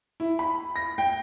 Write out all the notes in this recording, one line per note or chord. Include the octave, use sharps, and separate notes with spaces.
E4
B5
A#6
G5